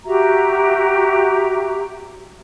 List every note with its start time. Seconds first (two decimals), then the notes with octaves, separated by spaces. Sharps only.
0.05 F#4 G4 E5 A#5